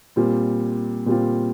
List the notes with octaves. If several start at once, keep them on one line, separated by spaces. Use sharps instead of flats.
A#2 G3 C4 F4
A#2 G3 C4 F4